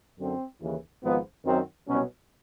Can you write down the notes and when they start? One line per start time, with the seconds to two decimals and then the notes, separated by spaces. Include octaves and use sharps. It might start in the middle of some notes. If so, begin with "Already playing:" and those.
0.19 F#2 D3 F#3 C4
0.60 D#2 C#3 E3
1.02 G#1 G#2 F3 B3
1.45 F#2 D#3 F#3 C4
1.87 C2 B2 F#3 C#4